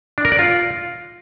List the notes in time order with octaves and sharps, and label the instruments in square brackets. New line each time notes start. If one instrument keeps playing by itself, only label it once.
[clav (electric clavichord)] D4
A#4
D5
F4